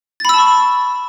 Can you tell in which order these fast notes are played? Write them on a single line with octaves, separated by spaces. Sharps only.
A6 B5 E6 A5 C#6